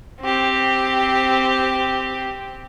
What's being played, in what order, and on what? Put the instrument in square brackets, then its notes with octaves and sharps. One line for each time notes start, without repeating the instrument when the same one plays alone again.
[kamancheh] C4 G4